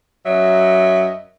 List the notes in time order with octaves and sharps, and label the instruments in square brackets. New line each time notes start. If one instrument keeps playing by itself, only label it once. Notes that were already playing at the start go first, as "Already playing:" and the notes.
[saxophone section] F#2 F#3 D#5 E5